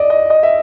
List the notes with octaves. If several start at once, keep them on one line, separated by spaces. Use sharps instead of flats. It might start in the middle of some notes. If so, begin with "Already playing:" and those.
Already playing: D5 D#5
D#5
D#5
E5